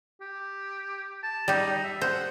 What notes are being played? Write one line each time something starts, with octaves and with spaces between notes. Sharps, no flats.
G4
A5
G3 D#4 G4
E5
C5 F#5